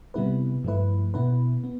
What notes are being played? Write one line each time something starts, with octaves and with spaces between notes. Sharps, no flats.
C3 G3 B3 E4 B4
G2 F3 A3 E4 B4
B2 B3 E4 B4
B3